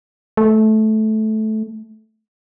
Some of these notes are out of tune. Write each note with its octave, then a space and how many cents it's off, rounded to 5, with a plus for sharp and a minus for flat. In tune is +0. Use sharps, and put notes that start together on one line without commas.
A3 -15